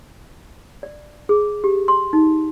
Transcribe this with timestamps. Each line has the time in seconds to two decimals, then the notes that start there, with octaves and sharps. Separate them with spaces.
0.83 D5
1.29 G#4
1.64 G4
1.88 C6
2.13 D#4